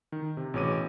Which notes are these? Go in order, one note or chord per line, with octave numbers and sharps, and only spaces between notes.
D#3
C3
A1 B2 G#4 C#5 D6 D#7